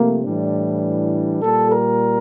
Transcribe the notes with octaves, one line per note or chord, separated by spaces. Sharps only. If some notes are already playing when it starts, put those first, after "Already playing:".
Already playing: C3 F3 A3 A#3
A2 E3 G3 D4
A#2 G3 A4
A#4